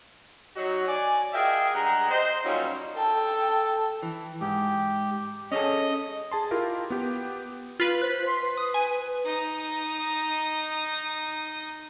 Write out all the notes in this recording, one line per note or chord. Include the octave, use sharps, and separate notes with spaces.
F#3 D#4 F#4
D5 G#5
F4 G#4 A#4 D#5 E5 G5
G2 G#3 G4 D#5 F#5 A#5
C5 D#5
F#3 G3 A#3 C#4 D#4 F4
A4 G5 A5
E3
G#2 G4
C#4 G#4 A4 D#5
G#4 A5 C6
E4 F4 G4 A#4
B3 G4
F4 B4
C5 F#6 B6
C6
B4
D#6
G#5 D#7
D#4 D#6